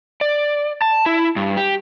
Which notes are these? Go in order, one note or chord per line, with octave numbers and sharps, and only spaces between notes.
D5
A5
E4
G2
G4